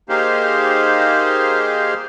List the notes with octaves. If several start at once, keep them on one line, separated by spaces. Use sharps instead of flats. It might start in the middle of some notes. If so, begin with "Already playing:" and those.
A#3 D#4 G4 G#4 C5 F5